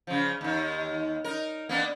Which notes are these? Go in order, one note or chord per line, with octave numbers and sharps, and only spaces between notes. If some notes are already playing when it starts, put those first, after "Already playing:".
C#3 F3
D#2 D#3
D#4 A#4
A#3 B3 D4